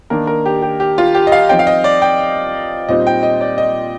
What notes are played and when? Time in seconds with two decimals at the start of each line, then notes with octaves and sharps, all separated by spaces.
0.10 D#3 A#3 D4 A#4
0.27 A#4
0.46 G4
0.62 G4
0.80 G4
0.98 F4
1.15 G4
1.27 D#5
1.32 F5
1.49 F3 C4 D#4 G5
1.59 F5
1.67 D#5
1.84 D5
2.02 G5
2.89 A#2 G3 C4 D#4 D#5
3.07 G5
3.23 D#5
3.41 D5
3.58 D#5